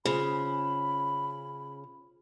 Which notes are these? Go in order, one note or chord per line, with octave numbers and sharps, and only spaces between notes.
C#3 F4 G#4 C5 B5